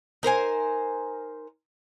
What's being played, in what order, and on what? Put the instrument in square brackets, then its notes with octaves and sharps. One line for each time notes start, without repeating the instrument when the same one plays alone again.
[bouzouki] D#4 A#4 C5 G#5